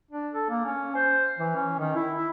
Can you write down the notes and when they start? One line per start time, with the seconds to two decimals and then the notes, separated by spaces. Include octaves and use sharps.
0.11 D4
0.34 A4
0.50 A#3
0.65 C#4
0.96 C5
1.39 E3
1.55 C#4
1.79 D#3
1.95 E4
2.16 E4